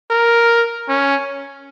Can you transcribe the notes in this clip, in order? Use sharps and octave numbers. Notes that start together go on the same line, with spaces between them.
A#4
C#4